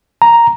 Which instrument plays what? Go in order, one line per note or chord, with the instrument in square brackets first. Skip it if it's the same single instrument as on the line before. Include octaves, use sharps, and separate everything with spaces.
[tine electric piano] A#5